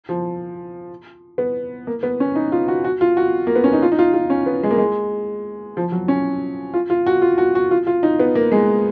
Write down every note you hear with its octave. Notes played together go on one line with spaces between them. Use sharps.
F3
B3
A#3
B3
C#4
D#4
F4
F#4
F#4
F4
F#4
A#3
B3
C#4
D#4
F4
D#4
F4
F4
C#4
B3
G#3
A#3
G#3
F3
F#3
C#4
F4
F4
F#4
F4
F#4
F#4
F4
F4
D#4
B3
A#3
G#3